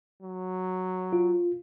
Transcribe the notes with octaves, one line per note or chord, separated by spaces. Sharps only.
F#3
F4